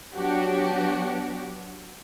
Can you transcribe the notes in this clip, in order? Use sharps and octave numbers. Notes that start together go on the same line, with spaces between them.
F#3 B3 D4 F#4 G4